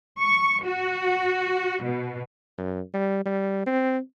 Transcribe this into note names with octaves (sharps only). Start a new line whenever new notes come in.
C#6
F#4
B2
F#2
G3
G3
C4